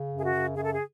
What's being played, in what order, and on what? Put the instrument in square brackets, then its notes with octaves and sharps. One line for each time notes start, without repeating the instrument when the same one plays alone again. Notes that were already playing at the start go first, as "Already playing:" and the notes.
Already playing: [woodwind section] C#3
F#2
G#4
F#4
C#3
F#2 G#4
A4
G#4